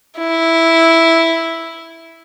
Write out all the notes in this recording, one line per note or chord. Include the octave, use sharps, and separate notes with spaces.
E4